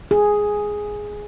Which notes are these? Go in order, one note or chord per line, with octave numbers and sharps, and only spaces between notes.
G#4